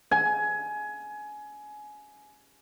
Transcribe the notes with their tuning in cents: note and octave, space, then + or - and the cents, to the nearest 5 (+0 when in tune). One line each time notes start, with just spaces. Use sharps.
G#5 +20